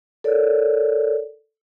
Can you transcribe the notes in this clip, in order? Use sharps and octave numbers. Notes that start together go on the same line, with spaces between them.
A4 A#4 C#5 D5